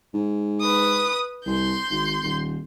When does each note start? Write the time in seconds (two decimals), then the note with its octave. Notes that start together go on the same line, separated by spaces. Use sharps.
0.14 G#2
0.61 B4 D#6
1.46 C2 C6 G6
1.90 G#1
2.22 D#1